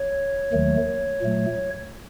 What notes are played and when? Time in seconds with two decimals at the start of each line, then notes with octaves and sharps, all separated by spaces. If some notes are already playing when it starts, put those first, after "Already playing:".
Already playing: C#5
0.52 D#2 D#3 F#3 A3
1.21 A#2 F#3 A3